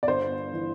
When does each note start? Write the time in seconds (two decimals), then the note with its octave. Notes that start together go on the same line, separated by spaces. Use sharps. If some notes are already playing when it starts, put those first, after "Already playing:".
0.03 D5
0.07 G1 C5
0.53 E3